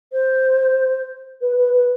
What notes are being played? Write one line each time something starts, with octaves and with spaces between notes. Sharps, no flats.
C5
B4
B4
B4